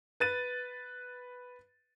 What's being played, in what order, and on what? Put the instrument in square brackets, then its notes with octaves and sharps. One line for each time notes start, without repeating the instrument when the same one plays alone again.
[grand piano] B4 A6 D#7